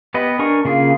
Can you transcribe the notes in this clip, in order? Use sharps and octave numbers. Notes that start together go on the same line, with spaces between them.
B3 G4 B4 D#5
D4 A#4 G#5 C#6
C#3 A#3 F4 G#4